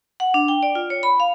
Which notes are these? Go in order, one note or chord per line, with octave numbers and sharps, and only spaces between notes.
F#5
D4
G5
D5
F4
C#5
B5
F5